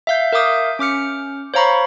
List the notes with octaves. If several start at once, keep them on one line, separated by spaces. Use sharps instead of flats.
E5 F5 G6
A#4 E5 F5 D6 D#6 G6
C#4 D6 F6 C#7
C5 C#5 F5 A#5 B5 C#6